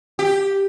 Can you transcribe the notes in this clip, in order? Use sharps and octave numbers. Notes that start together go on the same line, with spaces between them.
G4